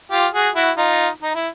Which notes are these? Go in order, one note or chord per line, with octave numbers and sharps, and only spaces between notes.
F4 G4
F#4 G#4
E4 F#4
D#4 F4
D#4
E4